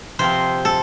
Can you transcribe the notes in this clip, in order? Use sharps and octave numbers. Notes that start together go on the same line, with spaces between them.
C3 F3 C4 C5
A4